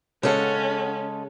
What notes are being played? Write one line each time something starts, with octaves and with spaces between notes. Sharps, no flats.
C#3 G#3 C#4 A4 F#5